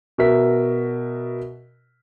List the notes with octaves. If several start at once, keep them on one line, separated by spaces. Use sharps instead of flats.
B2 F#4 A#4 E5 B6